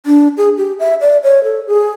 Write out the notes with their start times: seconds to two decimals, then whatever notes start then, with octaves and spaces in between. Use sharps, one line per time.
0.06 D4
0.37 G#4
0.57 G4
0.79 E5
1.01 D5
1.23 C#5
1.44 A4
1.67 G#4